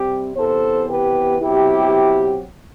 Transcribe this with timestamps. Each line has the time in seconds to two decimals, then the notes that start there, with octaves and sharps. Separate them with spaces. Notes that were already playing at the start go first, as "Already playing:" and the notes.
Already playing: C3 G3 C4 G4
0.35 C3 E3 B3 A4 C5
0.88 G4 B4
1.42 B2 F#3 C4 E4 G4